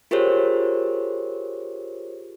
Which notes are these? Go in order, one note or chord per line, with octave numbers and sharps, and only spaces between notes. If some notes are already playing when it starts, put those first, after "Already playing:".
F4 G4 G#4 A#4 C5 C#5